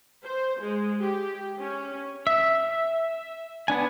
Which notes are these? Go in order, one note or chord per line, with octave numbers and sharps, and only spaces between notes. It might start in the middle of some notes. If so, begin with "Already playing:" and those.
C5
G#3
G4
C#4
E5
B3 D4 G#5